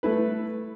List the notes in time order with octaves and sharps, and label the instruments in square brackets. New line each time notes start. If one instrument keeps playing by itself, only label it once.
[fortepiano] A3 E4 B4